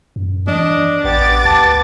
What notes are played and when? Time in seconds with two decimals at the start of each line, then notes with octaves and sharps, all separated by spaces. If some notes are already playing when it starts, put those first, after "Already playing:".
0.16 F#2
0.47 E3 D4 D#5
1.04 A1 B3 G4 D6 A6
1.45 D2 A5